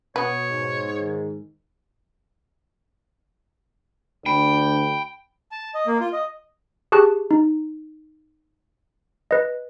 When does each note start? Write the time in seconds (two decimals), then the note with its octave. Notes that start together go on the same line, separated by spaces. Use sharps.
0.16 B2 B3 B4 C#5
0.49 G#2
1.01 D#3
4.26 D2 D4 G5 B5
5.51 A5
5.75 D#5
5.87 A#3
6.01 F4
6.13 D#5
6.92 G4 G#4 A5 C#6 F#6
7.31 D#4
9.31 B4 D#5